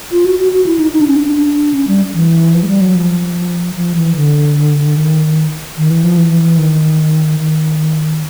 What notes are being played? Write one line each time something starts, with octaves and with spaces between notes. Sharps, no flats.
F4
F#4
F#4
F#4
E4
D#4
D#4
D4
C#4
D4
C#4
G3
E3
F3
G#3
G3
F#3
F3
F3
E3
D3
D#3
D#3
E3
F3
E3
D#3
D#3